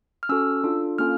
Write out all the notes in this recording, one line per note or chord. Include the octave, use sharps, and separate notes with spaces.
F6
C#4 F#4 A4 E6
D4 F4 A4
A#3 C#4 F4 A4 F6